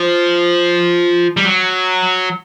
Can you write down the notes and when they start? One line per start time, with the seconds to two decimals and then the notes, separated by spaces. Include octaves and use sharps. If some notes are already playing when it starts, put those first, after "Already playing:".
Already playing: F3
1.37 G3
1.45 F#3